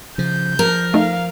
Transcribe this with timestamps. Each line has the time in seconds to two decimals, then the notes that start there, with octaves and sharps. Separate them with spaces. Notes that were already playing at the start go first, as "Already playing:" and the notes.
0.18 C#3 F3 G6
0.59 F3 A#4
0.94 A3 D#4 F5